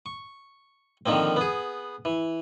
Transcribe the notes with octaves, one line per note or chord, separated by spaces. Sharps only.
C#6
D3 D#3 F3 A#3 C4
B3 G#4
E3